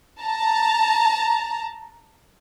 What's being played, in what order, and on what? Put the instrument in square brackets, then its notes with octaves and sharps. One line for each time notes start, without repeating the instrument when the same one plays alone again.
[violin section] A5 A#5